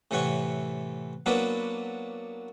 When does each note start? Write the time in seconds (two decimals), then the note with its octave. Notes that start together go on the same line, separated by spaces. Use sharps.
0.11 A2 C3 E3 C#5 F#5 C#6
1.26 F#3 A#3 B3 D4 E4 B4